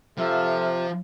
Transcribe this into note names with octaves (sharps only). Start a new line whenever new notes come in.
C3 F3 A4 E5 F5